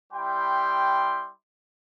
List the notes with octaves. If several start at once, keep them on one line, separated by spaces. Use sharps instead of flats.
G3 E4 G4 G5 C6